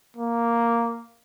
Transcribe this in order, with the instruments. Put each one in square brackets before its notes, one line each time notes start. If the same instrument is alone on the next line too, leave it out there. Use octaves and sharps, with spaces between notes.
[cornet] A#3